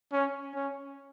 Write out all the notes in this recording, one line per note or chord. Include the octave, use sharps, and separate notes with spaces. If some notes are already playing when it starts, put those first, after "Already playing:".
C#4
C#4